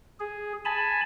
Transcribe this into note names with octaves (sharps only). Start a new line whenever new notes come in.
G#4
G#5 A5 B5